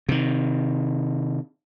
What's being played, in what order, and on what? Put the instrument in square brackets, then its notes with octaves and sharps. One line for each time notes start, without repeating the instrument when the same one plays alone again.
[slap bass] C3 D#3